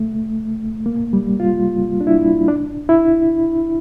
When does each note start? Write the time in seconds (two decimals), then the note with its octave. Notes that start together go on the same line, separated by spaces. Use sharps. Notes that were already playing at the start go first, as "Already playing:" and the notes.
Already playing: A3
0.86 A#3
1.13 G3
1.40 F4
2.01 D4
2.07 E4
2.48 D4
2.89 E4